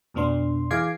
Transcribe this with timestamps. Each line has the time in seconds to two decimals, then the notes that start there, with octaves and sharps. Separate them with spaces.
0.14 F2 B2 B3 D4 C6
0.71 E3 G#4 F5 D6 G#6 C7